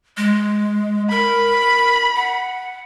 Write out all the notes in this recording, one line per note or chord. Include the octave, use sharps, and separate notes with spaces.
G#3
A#4 B5
F#5